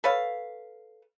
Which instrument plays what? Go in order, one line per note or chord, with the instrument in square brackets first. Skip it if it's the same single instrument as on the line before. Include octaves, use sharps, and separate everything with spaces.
[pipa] A4 B4 C#5 F5